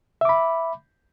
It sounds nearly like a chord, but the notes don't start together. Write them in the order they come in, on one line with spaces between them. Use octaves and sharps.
E5 D6 B5